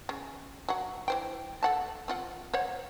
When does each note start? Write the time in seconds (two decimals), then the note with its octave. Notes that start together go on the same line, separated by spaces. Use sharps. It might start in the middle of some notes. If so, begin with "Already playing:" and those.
0.09 C#3
0.69 F#3 F#5
1.08 E3 C5 G5
1.63 A4 F#5 A5
2.08 C4 F4 F#5
2.54 C5 C#5 F#5